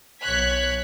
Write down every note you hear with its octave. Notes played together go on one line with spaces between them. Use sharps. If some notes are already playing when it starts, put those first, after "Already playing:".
B1 C#5 F#6 G#6 B6